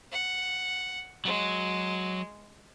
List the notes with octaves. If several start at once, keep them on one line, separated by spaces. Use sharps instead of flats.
F#5
F#3 G#3